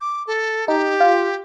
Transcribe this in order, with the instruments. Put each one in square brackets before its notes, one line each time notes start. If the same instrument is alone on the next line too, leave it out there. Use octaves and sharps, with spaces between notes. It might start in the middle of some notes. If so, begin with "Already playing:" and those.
[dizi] D6
A4
[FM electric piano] D#4 [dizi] G4
[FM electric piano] F4